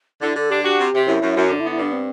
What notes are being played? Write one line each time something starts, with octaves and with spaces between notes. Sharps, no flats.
D3 E4
D3 A4
D4 G4
F#4 G4
C3
C3
F#2 E4
F#2
F#2
D3 D4
E4
B3
E4
G2 D4
C4